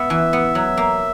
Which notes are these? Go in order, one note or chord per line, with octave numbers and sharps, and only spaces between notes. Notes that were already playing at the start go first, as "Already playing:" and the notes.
Already playing: B3 E5
E3
B3
F#3
A#3